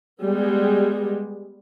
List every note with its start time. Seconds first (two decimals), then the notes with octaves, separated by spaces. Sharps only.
0.24 G3 G#3 B3 G#4